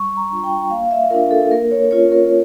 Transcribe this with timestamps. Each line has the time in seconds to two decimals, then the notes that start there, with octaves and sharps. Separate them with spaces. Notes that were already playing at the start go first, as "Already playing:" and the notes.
Already playing: G3 C#6
0.17 A#5
0.30 D4 F4
0.44 G5
0.70 A#3 F5
0.85 F5
0.91 E5
1.10 D4 F4 A#4
1.31 A4
1.51 A#3 A#4
1.71 C#5
1.91 C#4 F4 C#5
2.12 A#4